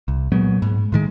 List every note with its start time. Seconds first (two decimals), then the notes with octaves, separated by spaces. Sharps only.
0.08 C2
0.32 A#2 F#3 G#3 B3
0.62 G#2
0.92 A2 D#3 G#3